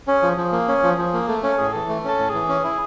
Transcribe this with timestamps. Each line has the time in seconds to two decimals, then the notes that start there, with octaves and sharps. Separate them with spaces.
0.07 C#4 G#4
0.22 F3
0.37 F3
0.52 A#3
0.68 C#4
0.83 F3
0.98 F3
1.13 A#3
1.28 A3 A4
1.43 C#4 A4
1.58 A2 G#4
1.73 E3 A4
1.89 A3
2.04 C#4 A4
2.19 A2
2.30 E3 G#4
2.49 C#4
2.64 E4